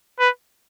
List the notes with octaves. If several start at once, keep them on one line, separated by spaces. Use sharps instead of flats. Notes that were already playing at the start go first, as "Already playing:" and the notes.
B4